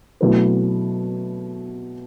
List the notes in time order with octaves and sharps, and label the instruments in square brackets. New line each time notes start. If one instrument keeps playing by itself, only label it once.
[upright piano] B2 F#3 A3 E4 B4